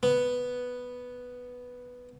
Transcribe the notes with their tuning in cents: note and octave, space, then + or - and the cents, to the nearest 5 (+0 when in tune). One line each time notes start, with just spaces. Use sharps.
B3 +0